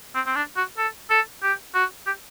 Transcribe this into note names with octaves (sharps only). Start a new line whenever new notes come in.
C4
C4
D4
F#4
A4
A4
G4
F#4
G4